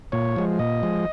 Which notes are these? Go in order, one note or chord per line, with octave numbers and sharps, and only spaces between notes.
A#2 C#5
F3 G#3
A#2 D#5
F3 G#3